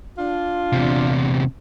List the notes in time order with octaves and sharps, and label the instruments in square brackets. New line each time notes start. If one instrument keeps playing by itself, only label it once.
[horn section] D4 F4
[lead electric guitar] E2 C3